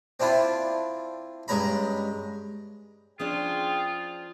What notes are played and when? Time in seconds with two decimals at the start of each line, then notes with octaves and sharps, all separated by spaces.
0.20 C4 D4 E4 F4
1.48 G2 G#3 C#4 A#5 B5
3.20 F3 C#4 D4 F4 G#4 G5